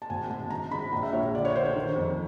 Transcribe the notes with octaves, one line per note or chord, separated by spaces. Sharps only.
A5
G#1 G#5
G#1 A5
G#3 A#5
G#3 B5
A#1 A#5
E5
A#1 C#5
D3 D5
C#5
D3 C5
C#5
D#3
F2